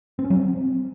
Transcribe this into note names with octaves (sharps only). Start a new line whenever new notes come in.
C4
C#4
F#3
C4